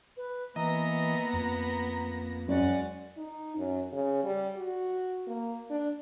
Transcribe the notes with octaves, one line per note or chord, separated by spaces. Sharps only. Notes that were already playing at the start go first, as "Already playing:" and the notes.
B4
E3 A#3 B3 D#5 A#5 A#6
F2
F#2 G#3 C#4 D5 F#5
D#4
F#2
C#3
G3
F#4
A#3
D4